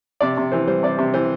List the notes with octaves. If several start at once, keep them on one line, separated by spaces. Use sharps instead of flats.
C3 D5
C3
E3 C5
G3 C5
C3 D5
C3
E3 C5